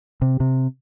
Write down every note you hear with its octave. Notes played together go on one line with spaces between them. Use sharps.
C3
C3